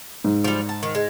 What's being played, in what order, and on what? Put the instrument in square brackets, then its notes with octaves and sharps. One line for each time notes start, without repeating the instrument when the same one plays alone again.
[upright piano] G#2
[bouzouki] F3 G3
A5
D#3
G#3